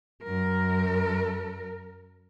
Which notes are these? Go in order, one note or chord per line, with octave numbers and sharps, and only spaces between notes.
F#2 A#4